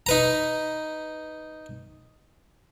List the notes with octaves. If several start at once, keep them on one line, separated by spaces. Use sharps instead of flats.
D#4 B4 A#5